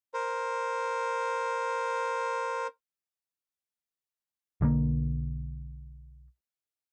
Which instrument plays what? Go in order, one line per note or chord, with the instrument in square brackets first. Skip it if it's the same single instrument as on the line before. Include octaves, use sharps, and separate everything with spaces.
[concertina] A#4 C5
[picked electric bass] B1 D3 G3 A#3